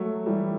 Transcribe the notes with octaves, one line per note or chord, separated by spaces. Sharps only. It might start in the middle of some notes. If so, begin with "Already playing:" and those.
Already playing: F#3 A3
E3 G3